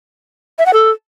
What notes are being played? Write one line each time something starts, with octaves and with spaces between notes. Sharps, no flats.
E5
F#5
A4